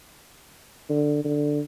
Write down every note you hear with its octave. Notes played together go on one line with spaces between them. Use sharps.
D3
D3